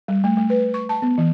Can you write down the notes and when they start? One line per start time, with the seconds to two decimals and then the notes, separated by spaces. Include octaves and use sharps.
0.08 G3
0.24 A3
0.37 A3
0.50 B4
0.74 C#6
0.89 A5
1.02 B3
1.18 E3